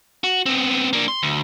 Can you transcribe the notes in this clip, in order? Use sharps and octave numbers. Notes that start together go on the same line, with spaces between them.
F#4
B3 C4
A#3 D4
C6
D2